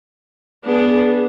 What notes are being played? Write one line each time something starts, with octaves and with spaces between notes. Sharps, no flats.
B3 D4 G#4